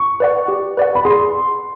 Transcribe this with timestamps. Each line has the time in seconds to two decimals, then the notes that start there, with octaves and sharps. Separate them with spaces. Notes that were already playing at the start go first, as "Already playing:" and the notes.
Already playing: C#6
0.20 B4 D5 F#5
0.48 G4
0.77 B4 D5 F#5
0.95 B5
1.05 G#4 C6